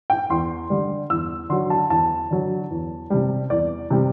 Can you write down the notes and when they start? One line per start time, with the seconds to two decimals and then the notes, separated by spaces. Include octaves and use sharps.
0.10 G5
0.30 E2 C6
0.70 D3 G3
1.10 E2 E6
1.49 D3 F#3 C6
1.70 A5
1.90 E2 A5
2.31 D3 F#3
2.71 E2
3.10 C3 G3
3.50 E2 D5
3.90 C3 G3